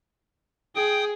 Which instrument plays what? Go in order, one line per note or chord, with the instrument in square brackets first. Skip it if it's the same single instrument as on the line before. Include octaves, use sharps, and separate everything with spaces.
[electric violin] G#4 [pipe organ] G5 D#6